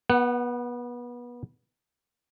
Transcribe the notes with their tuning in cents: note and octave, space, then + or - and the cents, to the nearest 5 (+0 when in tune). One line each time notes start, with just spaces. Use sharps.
B3 -25 F#5 +15